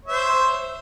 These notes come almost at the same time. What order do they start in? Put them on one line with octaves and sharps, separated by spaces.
C#5 E5 C5